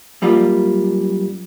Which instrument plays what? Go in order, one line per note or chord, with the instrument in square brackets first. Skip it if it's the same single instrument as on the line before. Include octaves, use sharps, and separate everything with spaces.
[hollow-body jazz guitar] F#2 G3 A#3 F4